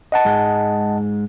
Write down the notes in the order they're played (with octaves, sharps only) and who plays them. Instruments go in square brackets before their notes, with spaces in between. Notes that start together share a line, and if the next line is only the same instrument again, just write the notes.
[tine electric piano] D#5 F#5 A5
[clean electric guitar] G#2 G#3